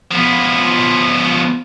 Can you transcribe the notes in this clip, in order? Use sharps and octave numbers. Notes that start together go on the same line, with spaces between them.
F3 B3